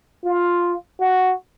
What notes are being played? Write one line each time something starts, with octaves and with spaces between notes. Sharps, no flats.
F4
F#4